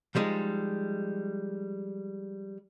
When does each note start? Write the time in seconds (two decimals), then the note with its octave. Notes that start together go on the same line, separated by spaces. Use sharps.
0.15 F3 G3 G#3 D#4